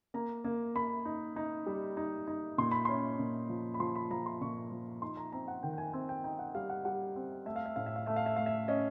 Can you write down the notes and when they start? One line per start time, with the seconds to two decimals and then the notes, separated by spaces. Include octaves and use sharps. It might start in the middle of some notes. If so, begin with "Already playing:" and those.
0.14 A#3 A#5
0.44 A#3
0.75 A#3 B5
1.05 D#4
1.36 D#4
1.66 G3
1.97 D#4
2.27 D#4
2.58 A#2 C6
2.71 B5
2.85 C#4 C6
3.19 A#2
3.49 F3
3.74 B5
3.80 F3 C6
3.95 B5
4.11 F3 A#5
4.26 C6
4.41 A#2 C#6
4.72 F3
5.02 D#4 C6
5.17 A#5
5.32 C4 A#5
5.48 F#5
5.63 D#3 G5
5.73 G5
5.78 G#5
5.93 C4 G#5
6.09 G5
6.24 D#4 G5
6.39 F#5
6.55 G3 F5
6.70 F#5
6.85 G3 F#5
7.16 C4
7.46 A3 E5
7.56 F5
7.66 E5
7.76 A2 F5
7.86 E5
7.96 F5
8.06 A3 E5
8.16 F5
8.26 E5
8.36 A3 F5
8.46 E5
8.68 C#4 D#5